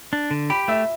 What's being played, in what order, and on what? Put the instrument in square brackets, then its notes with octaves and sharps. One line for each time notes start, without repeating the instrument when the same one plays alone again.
[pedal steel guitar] D4
D3
[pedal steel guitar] G4 [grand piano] B5
[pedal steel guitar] A3 [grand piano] E5